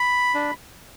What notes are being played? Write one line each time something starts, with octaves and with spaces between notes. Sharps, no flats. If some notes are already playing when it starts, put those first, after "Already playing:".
Already playing: B5
D4